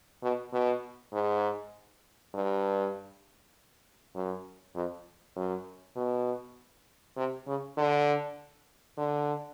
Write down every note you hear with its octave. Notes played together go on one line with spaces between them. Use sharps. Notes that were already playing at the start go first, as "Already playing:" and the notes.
B2
B2
G#2
G2
F#2
F2
F#2
B2
C3
C#3
D3
D3